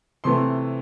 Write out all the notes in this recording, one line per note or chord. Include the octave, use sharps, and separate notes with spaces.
C3 E3 A3 C6